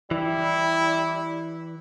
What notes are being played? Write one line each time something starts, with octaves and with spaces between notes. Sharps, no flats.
E3 G3 E4